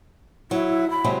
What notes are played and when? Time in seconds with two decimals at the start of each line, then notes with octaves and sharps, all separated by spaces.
0.51 F#3 E4
0.90 B5
1.04 C3 F#3 G#3